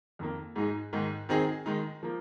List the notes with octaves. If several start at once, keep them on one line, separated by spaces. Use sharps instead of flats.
F2 D#3 A#3
G#2 G#3 D#4 G#4
G#2 D#3 G#3
D#3 C4 D#4 G#4
D#3 G#3 D#4
F3 A#3